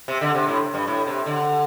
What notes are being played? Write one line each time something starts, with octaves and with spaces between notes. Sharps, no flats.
C3
D3
C3
A2
G2
A2
C3
D3